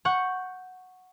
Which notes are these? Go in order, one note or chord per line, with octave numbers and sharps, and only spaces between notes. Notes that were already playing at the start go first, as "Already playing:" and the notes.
F#5 C#6 G6